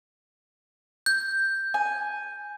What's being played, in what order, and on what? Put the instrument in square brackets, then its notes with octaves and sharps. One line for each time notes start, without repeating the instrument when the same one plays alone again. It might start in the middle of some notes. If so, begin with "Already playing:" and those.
[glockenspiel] G6
[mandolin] G#5